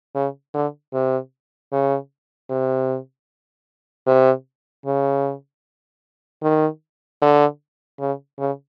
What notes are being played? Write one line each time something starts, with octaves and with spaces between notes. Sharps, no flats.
C#3
D3
C3
C#3
C3
C3
C#3
D#3
D3
C#3
C#3